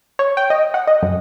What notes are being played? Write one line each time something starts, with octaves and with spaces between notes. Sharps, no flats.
C#5
G5
D#5
F#5
D#5
F#2